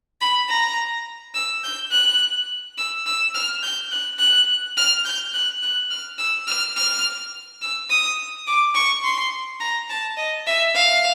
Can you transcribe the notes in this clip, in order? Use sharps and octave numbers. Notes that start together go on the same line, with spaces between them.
B5
A#5
E6
G6
F#6
E6
E6
F6
G6
F#6
F#6
F6
G6
F#6
F#6
F6
E6
F6
F6
E6
D#6
D6
C#6
C6
A#5
A5
D#5
E5
F5